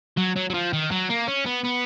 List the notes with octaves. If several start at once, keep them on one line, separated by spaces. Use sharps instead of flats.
F#3
F#3
F#3
F3
D#3
F#3
A#3
C#4
B3
B3